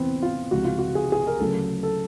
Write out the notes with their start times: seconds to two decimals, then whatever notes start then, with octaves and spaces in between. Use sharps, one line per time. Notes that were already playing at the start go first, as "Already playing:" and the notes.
Already playing: E2 C3 E3 B3 C4
0.22 F4
0.51 C#2 C3 F3 F#4
0.65 F4
0.79 F#4
0.95 G#4
1.04 G4
1.12 G#4
1.27 A#4
1.39 D2 C#3 F#3 A4
1.83 A4